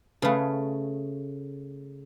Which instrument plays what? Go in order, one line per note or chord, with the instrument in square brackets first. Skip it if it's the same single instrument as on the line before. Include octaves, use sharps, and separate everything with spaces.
[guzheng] C#3 A3 [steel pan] G#4 B4 F5